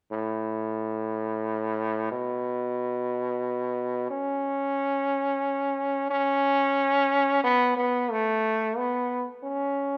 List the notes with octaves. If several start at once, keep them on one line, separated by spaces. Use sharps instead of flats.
A2
B2
C#4
C#4
B3
B3
A3
B3
C#4